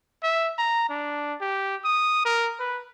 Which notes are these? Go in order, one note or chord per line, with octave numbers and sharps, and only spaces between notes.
E5
A#5
D4
G4
D#6
A#4
B4